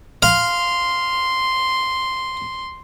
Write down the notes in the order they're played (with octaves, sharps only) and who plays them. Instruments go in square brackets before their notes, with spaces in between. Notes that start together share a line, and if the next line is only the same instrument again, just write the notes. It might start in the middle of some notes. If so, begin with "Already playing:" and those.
[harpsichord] F5 [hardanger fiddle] C6